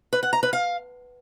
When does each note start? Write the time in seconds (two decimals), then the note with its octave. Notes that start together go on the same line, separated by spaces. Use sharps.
0.13 B4
0.23 F#5
0.33 A#5
0.43 B4
0.53 F5